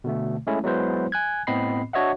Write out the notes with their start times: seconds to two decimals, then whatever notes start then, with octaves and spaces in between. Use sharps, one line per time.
0.04 B2 D3 A3
0.47 G#3 A3 C#4 E4
0.64 F#3 G#3 B3 E4 B4 C5
1.12 G#5 F#6 G#6
1.47 A2 B3 C4 D#5 B5 C7
1.93 D4 F#4 C#5 D#5 E5 F#5